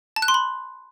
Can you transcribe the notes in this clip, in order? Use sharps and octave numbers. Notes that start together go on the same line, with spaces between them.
A5
F#6
C6
B5